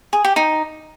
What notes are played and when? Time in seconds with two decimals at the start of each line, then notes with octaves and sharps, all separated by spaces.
0.13 G#4
0.24 G4
0.36 D#4